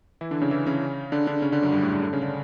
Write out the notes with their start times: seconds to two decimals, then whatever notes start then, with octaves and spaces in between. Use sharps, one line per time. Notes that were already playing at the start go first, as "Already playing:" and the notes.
0.21 E3 E4
0.31 D3 D4
0.41 C#3 C#4
0.51 E3 E4
0.67 C#3 C#4
1.12 D3 D4
1.27 D3 D4
1.42 C#3 C#4
1.52 D3 D4
1.62 F#2 F#3
1.72 G2 G3
1.82 A2 A3
1.92 D3 D4
2.03 D3 D4
2.13 C#3 C#4
2.23 D3 D4